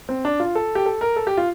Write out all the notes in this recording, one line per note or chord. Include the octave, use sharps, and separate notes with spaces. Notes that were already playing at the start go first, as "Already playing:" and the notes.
C4
D4
F4
A4
G4
A4
A#4
A4
G4
F4